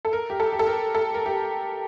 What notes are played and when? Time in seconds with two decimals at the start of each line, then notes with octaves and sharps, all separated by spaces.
0.05 A4
0.13 A#4
0.30 G4
0.40 A4
0.52 G4
0.59 A4
0.67 A#4
0.95 A4
1.14 A#4
1.26 G4